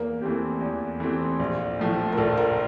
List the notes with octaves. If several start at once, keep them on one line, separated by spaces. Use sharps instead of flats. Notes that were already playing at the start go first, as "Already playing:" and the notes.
Already playing: E2 A#3
E3 A3 C4 G4
E2
E3 A3 C4 G4
A#1
A2 F3 A3
A#4
A#1 A4
A#4